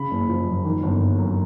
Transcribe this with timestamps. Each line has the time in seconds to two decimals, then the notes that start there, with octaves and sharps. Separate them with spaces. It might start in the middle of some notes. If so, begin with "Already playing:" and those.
Already playing: C#3 B5
0.11 F#1
0.29 F3
0.46 F#2
0.65 D#3
0.83 G1
1.02 F#3
1.19 F#2